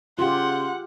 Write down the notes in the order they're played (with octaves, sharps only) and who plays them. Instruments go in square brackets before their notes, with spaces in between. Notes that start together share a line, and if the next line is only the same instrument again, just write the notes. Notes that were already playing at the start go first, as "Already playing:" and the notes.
[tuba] C#3 [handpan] F4 G4 [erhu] F#5 [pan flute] C6